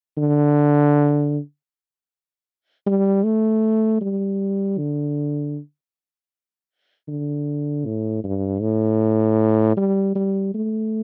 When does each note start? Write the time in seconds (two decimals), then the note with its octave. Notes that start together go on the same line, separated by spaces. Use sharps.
0.17 D3
2.86 G3
3.24 A3
4.01 G3
4.78 D3
7.08 D3
7.86 A2
8.24 G2
8.61 A2
9.77 G3
10.15 G3
10.54 A3